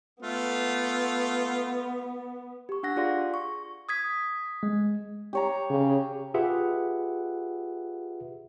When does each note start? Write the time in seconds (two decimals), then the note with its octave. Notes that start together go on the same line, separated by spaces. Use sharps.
0.22 A3 B3 F4
2.69 G4 C#6
2.83 D4 F#5 F#6 A#6
2.97 F4 G#4 D5 F5 C6
3.34 C#6
3.89 D#6 G#6 B6
4.63 G#3
5.33 G4 C#5 A#5
5.70 C#3
6.34 F4 G4 G#4 B4 E5 F#5